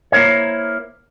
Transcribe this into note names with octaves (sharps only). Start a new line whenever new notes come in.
A#3 E4 A#4 C5 C#5